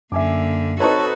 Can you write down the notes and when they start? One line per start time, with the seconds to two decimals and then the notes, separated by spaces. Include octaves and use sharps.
0.12 F#2 D3 A#3 E5 G#5 D6
0.80 C4 D#4 F#4 A4 B4 C#5 A5 C#6